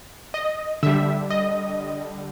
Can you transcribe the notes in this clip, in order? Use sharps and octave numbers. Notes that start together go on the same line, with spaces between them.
D#5
D3 G3 E5
D#5